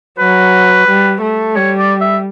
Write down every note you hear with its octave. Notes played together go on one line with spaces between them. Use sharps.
F#3 B4
G3
A3
G3 C#5
D5
E5